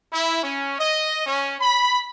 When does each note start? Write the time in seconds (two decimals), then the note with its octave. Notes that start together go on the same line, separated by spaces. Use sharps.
0.12 E4
0.43 C#4
0.79 D#5
1.27 C#4
1.61 B5